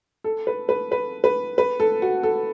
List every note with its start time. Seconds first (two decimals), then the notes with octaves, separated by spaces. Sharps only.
0.24 A4
0.47 B4
0.69 B4
0.92 B4
1.24 B4
1.58 B4
1.80 A4
2.02 F#4
2.23 A4